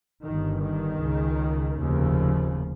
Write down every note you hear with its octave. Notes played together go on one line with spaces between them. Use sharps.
G1 G2 D#3
D#3
C#2 C#3
F1 D#2 C#3 F3